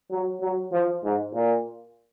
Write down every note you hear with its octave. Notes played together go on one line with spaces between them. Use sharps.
F#3
F#3
F3
G#2
A#2